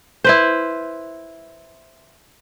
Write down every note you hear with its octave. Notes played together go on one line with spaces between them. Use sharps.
E4 B4 C5